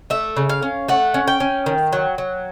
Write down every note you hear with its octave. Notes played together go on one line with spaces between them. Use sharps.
A3 E5
C#3
F5
C#4
A3 F#5
C#4
G5
C#4
D#3
F#3
F#3